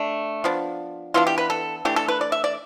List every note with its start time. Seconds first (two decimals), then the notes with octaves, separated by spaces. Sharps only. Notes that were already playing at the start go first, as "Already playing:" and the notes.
Already playing: A3 D4
0.44 F3 B3 D4
1.14 E3 B3 D4 F4
1.27 G4
1.38 B4
1.50 A4
1.85 E3 A3 D4 G4
1.96 A4
2.08 B4
2.21 D5
2.32 E5
2.44 D5